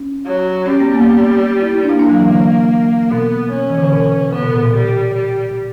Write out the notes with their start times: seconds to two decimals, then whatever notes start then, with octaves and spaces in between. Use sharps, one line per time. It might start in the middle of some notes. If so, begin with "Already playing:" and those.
Already playing: C#4
0.26 F#3
0.66 G3 C#4
0.80 B3
0.94 A#3
1.06 B3
1.62 E4
1.75 E4
1.83 D4
1.89 A#3 E4
1.99 D4
2.09 F#3
2.19 E3
2.29 D3
3.11 B2 B3
3.52 C#4
3.70 E3
3.78 D3
3.84 C#3
3.92 B2
4.12 C#3
4.33 C#3 B3
4.43 B2
4.53 A#2
4.63 B2
4.74 G3
5.14 G3